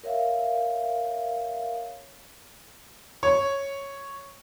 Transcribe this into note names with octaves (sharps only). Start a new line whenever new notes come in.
A#4 C#5 E5 F5
C#5